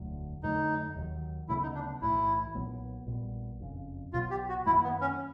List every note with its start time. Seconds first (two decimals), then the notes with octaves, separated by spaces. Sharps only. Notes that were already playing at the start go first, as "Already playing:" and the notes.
Already playing: E1 D2 D3 F#3
0.43 F2 D3 F#3 A3 D#4
0.96 D#2 D#3 F#3
1.48 D2 C#3 F#3 B3 E4
1.62 D#4
1.75 D4
2.01 B1 A2 E3 E4
2.55 B1 A#2 F#3 B3
3.06 A#1 A#2 G3 B3
3.60 F#1 F2 C#3
4.13 B1 B2 F#3 B3 F4
4.31 G4
4.49 F#4
4.66 F#2 D#3 F#3 A#3 E4
4.83 B3
5.01 C#4